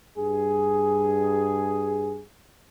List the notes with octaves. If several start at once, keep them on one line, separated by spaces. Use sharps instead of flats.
G2 G#4